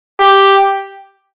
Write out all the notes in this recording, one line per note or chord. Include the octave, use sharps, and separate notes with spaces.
G4